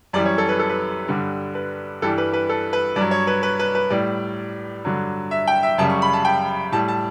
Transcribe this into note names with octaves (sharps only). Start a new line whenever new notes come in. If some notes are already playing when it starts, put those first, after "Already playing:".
F#2 E3 G3 D5
C#5
A4
B4
A4
B4
G2 D3 G3
B4
G2 E3 G3 A4
B4
B4
A4
B4
G2 D5
F#3
C#5
B4
B4
B4
B4
A2 G3 D5
G2 D3 F#3
E5
G5
E5
F#2 C#3 G3 A5
C#6
B5
A5
G5
A2 G3 A5
A5